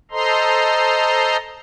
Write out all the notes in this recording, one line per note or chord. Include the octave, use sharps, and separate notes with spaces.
A4 C5 D#5 A#5 C6